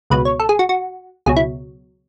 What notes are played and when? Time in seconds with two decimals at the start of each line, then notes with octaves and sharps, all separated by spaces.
0.10 C#2 B2 F#3 B4
0.25 C#5
0.40 A4
0.49 G#4
0.59 F#4
0.69 F#4
1.26 C#2 B2 F#3 G#4
1.37 E4